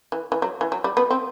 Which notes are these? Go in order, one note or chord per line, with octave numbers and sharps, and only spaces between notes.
E3
E3
F#3
E3
F#3
G3
B3
C4